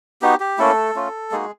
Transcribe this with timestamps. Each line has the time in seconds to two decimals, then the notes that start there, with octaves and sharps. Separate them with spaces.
0.22 B3 D#4 F#4 G4
0.40 G4
0.58 A3 A#3 C#4 E4 A4
0.95 A3 C#4 F4
1.32 G#3 A#3 D#4 F#4 G#4